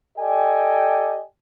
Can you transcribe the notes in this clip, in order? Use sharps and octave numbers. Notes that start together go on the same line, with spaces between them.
G4 A4 D5 D#5 G5 G#5